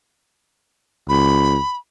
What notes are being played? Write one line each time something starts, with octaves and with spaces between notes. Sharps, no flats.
C#2 B5